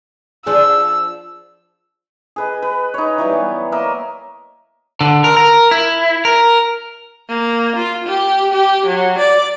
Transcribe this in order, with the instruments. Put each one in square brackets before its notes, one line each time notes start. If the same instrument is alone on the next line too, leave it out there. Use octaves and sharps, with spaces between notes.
[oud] F3 D4 G#4 [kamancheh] E6
[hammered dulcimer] G#4 B4 D#5
B4
D#4 C#5
E3 F#3 G3
B3
A#3 A#4 D#5 E5
[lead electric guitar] D3
A#4
A#4
E4
A#4
[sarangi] A#3
F4
G4
G4
F#3
D5